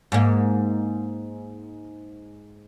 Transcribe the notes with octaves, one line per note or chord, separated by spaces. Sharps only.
G#2 A#3